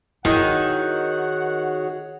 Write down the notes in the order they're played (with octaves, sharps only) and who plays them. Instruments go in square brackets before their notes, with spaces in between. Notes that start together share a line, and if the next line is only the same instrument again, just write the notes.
[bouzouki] D#3 [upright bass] E4 [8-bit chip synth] F#4 G#4 C#5 [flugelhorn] F#5